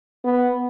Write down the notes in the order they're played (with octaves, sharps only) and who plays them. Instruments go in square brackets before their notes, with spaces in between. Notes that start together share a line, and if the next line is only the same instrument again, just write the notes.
[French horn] B3